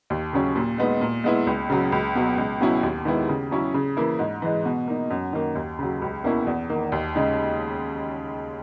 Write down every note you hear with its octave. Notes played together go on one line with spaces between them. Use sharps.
D#2
C#3 F#3 C#4
A#2
G#3 B3 D#4
A#2
G#3 B3 E4
C#2
C#3 F#3
C#2
B2 F#3
C#2
B2 F#3 C#4 E4
D#2
D#3 G#3 B3 E4
C#3
F#3 C#4 E4
C#3
E3 A#3 E4
G#2
E3 G#3
B2
A#3 D#4
F#2
D#3 A#3
D#2
C#3 F#3
C#2
B2 A#3 C#4 E4
E2
D#3 A#3
D#2
C#3 G#3 D#4